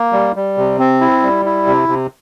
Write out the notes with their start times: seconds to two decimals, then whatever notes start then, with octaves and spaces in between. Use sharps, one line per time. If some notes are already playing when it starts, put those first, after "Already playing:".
Already playing: A#3
0.13 G3
0.36 G3
0.57 C3
0.79 C4
1.01 E4
1.23 G3
1.45 E4
1.67 C3
1.89 C3